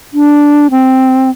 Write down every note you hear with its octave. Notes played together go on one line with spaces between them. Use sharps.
D4
C4